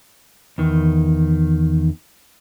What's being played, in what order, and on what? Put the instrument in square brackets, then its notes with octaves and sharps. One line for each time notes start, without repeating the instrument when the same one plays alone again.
[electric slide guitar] E2 D#3